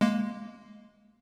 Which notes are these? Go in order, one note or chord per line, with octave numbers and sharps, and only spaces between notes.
G#3 A#3